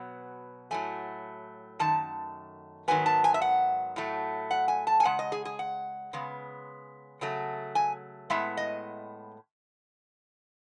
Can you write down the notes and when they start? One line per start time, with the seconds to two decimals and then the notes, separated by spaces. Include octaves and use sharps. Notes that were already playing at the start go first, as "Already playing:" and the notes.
Already playing: B2 F#3 B3
0.71 A2 F#3 A3 G#5
1.79 F#2 D#3 A3 A5
2.88 G#2 D#3 F#3 B3 G#5
3.06 A5
3.24 G#5
3.34 E5
3.41 F#5
3.96 A2 F#3 A3
4.51 F#5
4.68 G#5
4.87 A5
5.00 G#5
5.04 C#3 G#3 F#5
5.19 D#5
5.32 G#4
5.45 G#4
5.59 F#5
6.13 C#3 G#3 B3
7.21 C#3 F#3 A3
7.75 G#5
8.30 A2 G#3 B3 E5
8.57 D#5